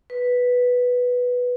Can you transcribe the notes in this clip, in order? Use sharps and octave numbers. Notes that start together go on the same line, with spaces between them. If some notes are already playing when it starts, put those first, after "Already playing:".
B4